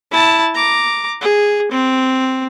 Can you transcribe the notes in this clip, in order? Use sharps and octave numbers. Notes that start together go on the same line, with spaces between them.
E4 A5
A#5 D6
G#4
C4